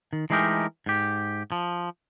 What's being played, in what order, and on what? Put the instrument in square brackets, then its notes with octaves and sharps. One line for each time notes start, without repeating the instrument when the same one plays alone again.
[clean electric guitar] D#3
E3 G#3 A3 D#4 G4 A#4
G#2 G4
F3